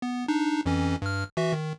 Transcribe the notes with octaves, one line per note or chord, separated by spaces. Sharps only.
B3
D4 D#4
F2 E3 C#4
G2 F6
E3 F#4 E5
D#3